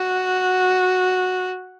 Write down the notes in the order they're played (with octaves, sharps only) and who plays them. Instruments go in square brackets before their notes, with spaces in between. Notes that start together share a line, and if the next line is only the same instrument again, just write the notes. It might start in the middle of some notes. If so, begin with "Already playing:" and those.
Already playing: [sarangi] F#4